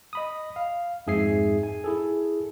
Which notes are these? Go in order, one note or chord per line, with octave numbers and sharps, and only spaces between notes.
D#5 B5 D#6
F5
F2 G#2 G#4 E5 G#5 C7
G#5
E4 G#4 A4